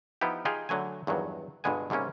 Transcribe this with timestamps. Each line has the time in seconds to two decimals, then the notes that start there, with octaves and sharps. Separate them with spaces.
0.21 F3 B3 D#4 E4 G4
0.45 D#4 F4 G4 G#4
0.69 D3 F#3 A3 G#5
1.07 E2 G2 D#3 F#3
1.64 G1 G2 B2 G#3 B3 G#5
1.90 G#2 C3 G3 A#3 C#4